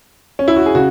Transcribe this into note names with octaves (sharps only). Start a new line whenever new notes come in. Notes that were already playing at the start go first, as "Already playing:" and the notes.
C#4
E4
F#4
G#4
C#3 F#4